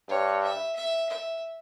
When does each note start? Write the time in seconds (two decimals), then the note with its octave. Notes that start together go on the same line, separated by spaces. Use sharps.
0.09 G2 C#5
0.43 E5
0.76 E5
1.09 E5